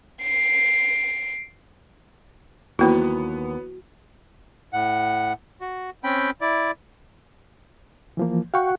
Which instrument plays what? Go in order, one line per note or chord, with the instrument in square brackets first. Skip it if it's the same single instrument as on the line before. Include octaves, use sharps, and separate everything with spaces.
[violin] C7 D7
[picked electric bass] D#2 [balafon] E3 A#3 E4 [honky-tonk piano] F#3 B3 [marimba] F#4 B5
[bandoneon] A2 F#5
F#4
C4 C#4 G5 B5
E4 D5
[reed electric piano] E3 F3 A#3
[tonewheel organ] F#4 [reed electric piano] F5 G5 C#6